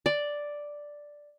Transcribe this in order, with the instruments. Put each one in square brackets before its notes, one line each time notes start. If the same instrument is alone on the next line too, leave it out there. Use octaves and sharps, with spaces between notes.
[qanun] D5